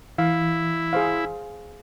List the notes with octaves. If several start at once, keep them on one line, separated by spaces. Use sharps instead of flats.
E3 E4 F5
G#4 C5 F5